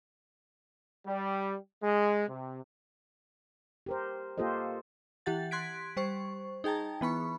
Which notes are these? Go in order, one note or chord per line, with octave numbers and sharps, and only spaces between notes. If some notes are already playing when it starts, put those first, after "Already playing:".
G3
G#3
C3
G4 A#4 C5
A#3 F4 G4 A4 C5 D#5
E3 G4 F#5 A6
C6 F#6 G#6 B6 D7
G3 C5 C#6
D#4 G#4 G5 A5 A#5
E3 B3 B5 C#6